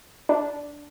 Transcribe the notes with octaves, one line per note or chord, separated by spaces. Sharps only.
D4